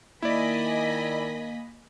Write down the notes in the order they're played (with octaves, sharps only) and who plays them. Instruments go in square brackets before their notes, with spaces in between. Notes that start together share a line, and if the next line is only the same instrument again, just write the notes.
[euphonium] D#3 [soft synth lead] A#3 [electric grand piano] E4 D5 [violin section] D#5 G#5 B5